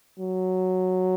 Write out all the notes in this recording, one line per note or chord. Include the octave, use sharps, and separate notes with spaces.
F#3